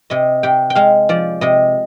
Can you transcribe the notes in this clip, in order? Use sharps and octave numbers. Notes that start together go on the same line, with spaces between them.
C3 D#5
C3 G5
G5
G#3 F5
F3 D5
C3 D#5